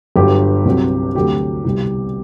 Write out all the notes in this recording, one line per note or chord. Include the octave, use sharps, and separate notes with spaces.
G1 G2 F#3 G4
C2 C3 F#3
D2 C3 F#3 G4
C2 B2 G3